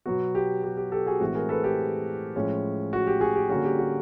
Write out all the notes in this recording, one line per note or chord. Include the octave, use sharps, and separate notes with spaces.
B2 F#3 B3 F#4
G4
G4
G4
G4 A4
F#4 G#4
A2 E3 G#3 C4 F#4
G#4 A#4
A4 B4
G4 A4
A2 F3 G#3 C#4
F#4
G4
F#4 G#4
G4
D3 G3 A#3 C#4 F#4 G#4
G4
F#4